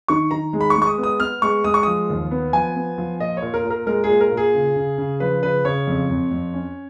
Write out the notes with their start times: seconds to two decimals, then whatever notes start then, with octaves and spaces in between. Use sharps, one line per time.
0.08 D#3 C#6
0.31 D#3 A#5
0.53 G#3
0.61 B5
0.70 C#6
0.75 G#3
0.82 C#6
0.87 D#6
0.98 B3
1.03 D#6
1.20 B3 F6
1.42 G#3 C#6
1.64 G#3 D#6
1.74 C#6
1.83 F3 D#6
2.09 D#2
2.31 B3
2.53 F3 G#5
2.76 B3
2.98 F3
3.20 A#2 D#5
3.37 C#5
3.42 A#2
3.54 A#4
3.64 A#2
3.70 A#4
3.86 G#3 A#4
4.04 G#4
4.09 A#2
4.21 A#4
4.32 A#2
4.37 G#4
4.54 C#3
4.76 C#3
4.98 C#3
5.20 F3 B4
5.43 C#3 B4
5.65 C#3 C#5
5.87 F2
6.09 F2
6.31 F2
6.54 C#4